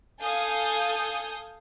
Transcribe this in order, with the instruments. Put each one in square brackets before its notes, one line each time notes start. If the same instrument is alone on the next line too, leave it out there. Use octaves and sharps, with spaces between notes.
[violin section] A4 F5 G#5 D#6 G6